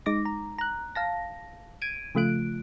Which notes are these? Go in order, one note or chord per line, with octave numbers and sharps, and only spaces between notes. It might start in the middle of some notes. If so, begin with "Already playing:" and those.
G#3 D#4 D6 A#6
A#5
A#5 F#6
F5 A5 A#6
G#6 D7 D#7
C#3 F3 A3 F4 F#6 D7